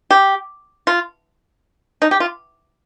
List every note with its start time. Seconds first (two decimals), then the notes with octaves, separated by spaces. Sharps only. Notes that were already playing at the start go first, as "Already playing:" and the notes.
0.11 G4
0.87 F4
2.02 D#4
2.11 G4
2.20 F4